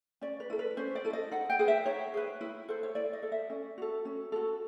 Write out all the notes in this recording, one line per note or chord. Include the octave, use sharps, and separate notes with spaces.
C#4 D5
B4
E4 A4
B4
C#4 C5
D5
E4 A4
D#5
D#4 F#5
G5
G#4 B4
E5
D#4 C#5
G#4 B4
E4
A4 C5
C#5
E4 D5
D#5
A4
E5
C#4
F#4 A4
C#4
F#4 A4